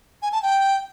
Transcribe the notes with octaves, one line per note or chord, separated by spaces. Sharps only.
G#5
A5
G5